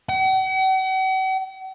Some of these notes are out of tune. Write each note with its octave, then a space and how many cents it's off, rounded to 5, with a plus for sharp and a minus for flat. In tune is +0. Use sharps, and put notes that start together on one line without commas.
F#5 +45